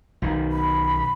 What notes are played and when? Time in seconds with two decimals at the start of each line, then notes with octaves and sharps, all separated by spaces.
0.22 B1 D#3
0.52 B5